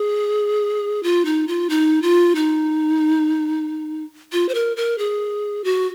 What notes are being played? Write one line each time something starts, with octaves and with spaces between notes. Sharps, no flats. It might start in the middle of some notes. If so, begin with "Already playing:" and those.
Already playing: G#4
F4
D#4
F4
D#4
F4
D#4
F4
C5
A#4
A#4
G#4
F#4